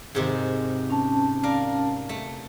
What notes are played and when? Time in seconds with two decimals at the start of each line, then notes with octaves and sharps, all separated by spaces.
0.15 G#2 C3 D#3
0.90 C#4 A5
1.43 A#4 D5 F5
2.09 A3